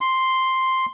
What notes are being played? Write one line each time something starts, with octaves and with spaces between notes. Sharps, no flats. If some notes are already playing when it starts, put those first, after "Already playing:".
C6